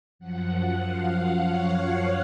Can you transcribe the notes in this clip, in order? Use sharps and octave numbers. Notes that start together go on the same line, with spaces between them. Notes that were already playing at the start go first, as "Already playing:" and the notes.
F#2 F3 F#5
F5
C#5